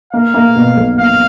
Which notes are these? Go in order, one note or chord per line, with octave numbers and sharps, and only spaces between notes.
A#3 F5
A#3
B2
B1
A#3 F5